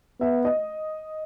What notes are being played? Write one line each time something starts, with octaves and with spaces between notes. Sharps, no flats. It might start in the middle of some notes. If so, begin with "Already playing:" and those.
B3 E5
D#5